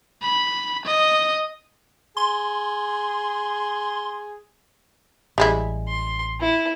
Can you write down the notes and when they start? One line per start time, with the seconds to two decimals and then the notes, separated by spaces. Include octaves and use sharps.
0.23 B5
0.85 D#5
2.17 G#4 C6
5.38 A1 G3 G#3 E4
5.88 C6
6.40 E4